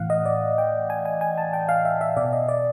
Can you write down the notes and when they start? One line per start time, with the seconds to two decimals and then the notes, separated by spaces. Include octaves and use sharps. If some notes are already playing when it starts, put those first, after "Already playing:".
Already playing: A2 E3 F5 F#5
0.10 D#5
0.25 D5
0.58 G5
0.90 G#5
1.05 G#5
1.21 G#5
1.38 A5
1.53 G5
1.69 F5
1.85 E5
2.01 E5
2.17 B2 D5
2.33 D#5
2.49 D5